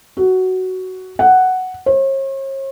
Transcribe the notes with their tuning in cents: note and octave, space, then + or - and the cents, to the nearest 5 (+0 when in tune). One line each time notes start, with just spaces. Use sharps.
F#4 +10
F#5 +5
C#5 -45